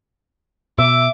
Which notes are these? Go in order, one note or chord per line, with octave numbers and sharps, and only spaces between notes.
B2 E5 D6